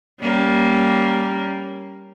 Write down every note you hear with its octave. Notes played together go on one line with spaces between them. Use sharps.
G3 A#3 C#4